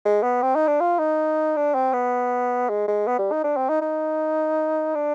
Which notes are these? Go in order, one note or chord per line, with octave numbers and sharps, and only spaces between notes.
G#3
B3
C4
D#4
D4
F4
D#4
D4
C4
B3
G#3
G#3
B3
G3
D#4
D4
C4
D#4
D#4
D4